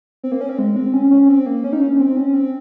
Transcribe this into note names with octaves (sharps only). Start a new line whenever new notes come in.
C4
A#3
C#4
C4
G#3
C4
C#4
C#4
C4
A#3
C#4
D#4
C#4
C4
C#4
C4